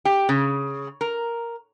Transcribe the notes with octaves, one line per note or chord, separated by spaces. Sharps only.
G4
C#3
A#4